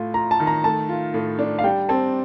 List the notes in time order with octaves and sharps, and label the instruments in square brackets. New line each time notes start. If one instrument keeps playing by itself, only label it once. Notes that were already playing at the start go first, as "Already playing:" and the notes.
Already playing: [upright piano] A2 A3 F4
[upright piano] F4 [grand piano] A#5
[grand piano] A5
[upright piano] D#3
[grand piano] A#5
[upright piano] A3 [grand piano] A5
[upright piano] F4
A2
D4
[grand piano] F5
[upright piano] G3 [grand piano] G5
[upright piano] C4 [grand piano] A5